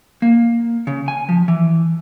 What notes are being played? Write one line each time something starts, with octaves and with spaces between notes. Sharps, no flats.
A#3
C#3
G#5
F3
E3